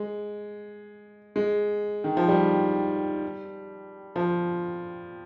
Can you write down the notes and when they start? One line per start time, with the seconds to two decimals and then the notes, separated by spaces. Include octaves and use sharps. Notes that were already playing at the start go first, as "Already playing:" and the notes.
Already playing: G#3
1.36 G#3
2.04 D#3
2.17 F3
2.28 G3
4.16 F3